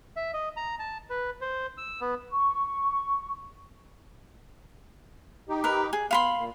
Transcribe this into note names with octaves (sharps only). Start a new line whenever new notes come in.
E5
D#5
A#5
A5
B4
C5
E6
B3
C#6
D#4 G4
A#4 B4
G#4
B3 F5 B5 C6
A#2